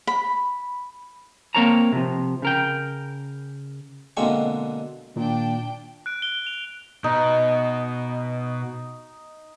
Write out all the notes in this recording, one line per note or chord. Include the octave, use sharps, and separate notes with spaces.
B5
A#3 C4 A#4 C#5 A5 A#5
C3 F3
C#3 A#4 G5
B2 D3 G#3 A#3 C4 C#6
A#2 D#3 D4 G5
F#6 D7
G7
F7
B2 D#4